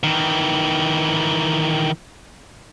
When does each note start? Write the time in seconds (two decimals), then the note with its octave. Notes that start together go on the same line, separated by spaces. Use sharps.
0.04 D#3 E3